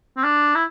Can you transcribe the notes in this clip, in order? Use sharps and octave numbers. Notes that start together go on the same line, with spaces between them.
C4
D4
E4